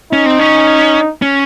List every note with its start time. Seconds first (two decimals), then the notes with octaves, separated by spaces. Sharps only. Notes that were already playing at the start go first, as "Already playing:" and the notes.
0.13 C#4 D#4
0.26 C4
0.39 C#4
1.22 C#4